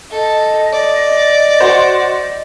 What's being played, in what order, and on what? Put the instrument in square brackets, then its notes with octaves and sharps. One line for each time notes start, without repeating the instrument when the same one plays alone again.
[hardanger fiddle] A4 [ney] D#5
[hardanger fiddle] D5
[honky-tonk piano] F#4 C5